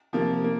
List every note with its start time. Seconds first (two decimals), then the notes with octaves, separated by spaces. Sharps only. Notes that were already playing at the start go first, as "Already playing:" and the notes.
0.13 C3 F3 A#3
0.44 A#3